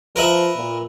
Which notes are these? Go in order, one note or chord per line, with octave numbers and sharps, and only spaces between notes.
F3 A#4 B4 E5
A#2